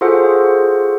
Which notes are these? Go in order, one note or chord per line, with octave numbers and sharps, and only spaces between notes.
F4 F#4 G#4 A4 C5 F#5